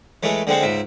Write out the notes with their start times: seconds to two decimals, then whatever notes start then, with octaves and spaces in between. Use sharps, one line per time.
0.23 E3 G#3 A3 C#5
0.47 D3 G#3 C4 C5 F#5
0.62 C#2 G#2 E5